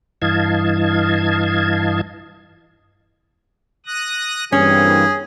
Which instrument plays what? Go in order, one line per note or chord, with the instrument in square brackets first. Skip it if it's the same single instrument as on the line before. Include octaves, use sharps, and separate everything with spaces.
[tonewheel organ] G2 E3 D#5 F5 A5 G#6
[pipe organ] D#6 F#6 A#6
[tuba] G2 [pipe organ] E3 A#3 C4 [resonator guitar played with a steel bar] C#4 [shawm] G#4